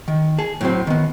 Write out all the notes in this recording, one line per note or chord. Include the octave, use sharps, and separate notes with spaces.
D#3
G#4 A5
A2 F#3 C4
D#3 B3